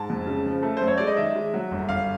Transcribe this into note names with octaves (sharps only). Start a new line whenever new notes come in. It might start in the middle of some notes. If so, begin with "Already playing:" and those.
Already playing: G#2 A5
F2
C#3
F3
A3
F#2 C5
C#5
G#3 D5
D#5
D#3 E5
G#3
F#3
G1
G1 F5